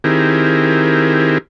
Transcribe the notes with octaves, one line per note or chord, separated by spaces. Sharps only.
D#3 C4 E4 G4 G#4 A#4